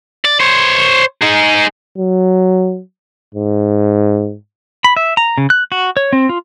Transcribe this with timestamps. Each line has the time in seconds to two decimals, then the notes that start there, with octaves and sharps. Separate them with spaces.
0.25 D5
0.40 C5 C#5
1.22 D#4 G#4
1.98 F#3
3.35 G#2
4.84 B5
4.97 E5
5.17 A#5
5.38 C#3
5.50 F#6
5.72 F#4
5.97 C#5
6.13 C4
6.29 F4